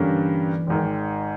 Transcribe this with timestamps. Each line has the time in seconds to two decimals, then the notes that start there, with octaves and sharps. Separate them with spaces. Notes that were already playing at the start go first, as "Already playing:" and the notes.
Already playing: G2 D3 E3 G3 A#3 C#4
0.67 G#1 G#2 D#3